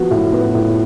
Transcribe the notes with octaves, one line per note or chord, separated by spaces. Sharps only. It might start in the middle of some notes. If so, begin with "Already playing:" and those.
Already playing: F3 B3 F#4
A2
B3
A2